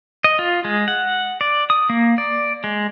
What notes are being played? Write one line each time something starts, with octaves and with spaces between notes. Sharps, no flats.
D#5
F4
G#3
F#5
D5
D#6
A#3
D5
G#3